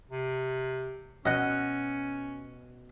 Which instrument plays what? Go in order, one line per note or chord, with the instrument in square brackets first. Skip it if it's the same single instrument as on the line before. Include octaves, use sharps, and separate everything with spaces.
[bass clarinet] C3
[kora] B2 [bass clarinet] C#4 [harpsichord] D#5 F#5